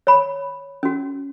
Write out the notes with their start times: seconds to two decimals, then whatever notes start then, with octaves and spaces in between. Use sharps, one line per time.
0.07 C#5 B5
0.83 C#4 F#4